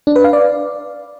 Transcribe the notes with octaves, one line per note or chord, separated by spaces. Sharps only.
D4
B4
F5
D5